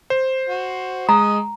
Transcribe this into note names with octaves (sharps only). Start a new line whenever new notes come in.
C5
F#4
G#3 D#5 A#5 D#6